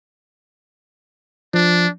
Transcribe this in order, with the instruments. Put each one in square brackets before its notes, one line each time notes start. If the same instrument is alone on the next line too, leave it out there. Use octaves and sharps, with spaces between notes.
[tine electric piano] F3 [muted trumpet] D4